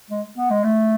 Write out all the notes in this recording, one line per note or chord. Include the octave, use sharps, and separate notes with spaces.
G#3
B3
G#3
A3